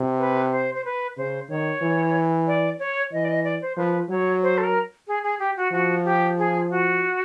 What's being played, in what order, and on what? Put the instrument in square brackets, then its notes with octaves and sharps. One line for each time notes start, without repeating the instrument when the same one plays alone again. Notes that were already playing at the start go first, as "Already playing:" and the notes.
Already playing: [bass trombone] C3
[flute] B4
C5
C5
B4
[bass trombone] C#3 [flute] C5
[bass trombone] D#3 [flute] C#5
[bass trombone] E3
[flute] D5
C#5
[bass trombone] E3 [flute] D#5
[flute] D5
D#5
D5
C5
[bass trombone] F3 [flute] B4
[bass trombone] F#3 [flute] C#5
[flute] C5
A4
A#4
G#4
G#4
G4
F#4
[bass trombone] F3 [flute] F#4
[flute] G4
G#4
F#4